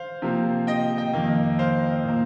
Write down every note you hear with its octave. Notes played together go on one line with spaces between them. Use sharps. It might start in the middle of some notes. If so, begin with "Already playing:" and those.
Already playing: C5 F5
C3 F3 A#3
D#5 G5
D#5 G5
F2 D#3 A#3
C5 F5
A#2 A#3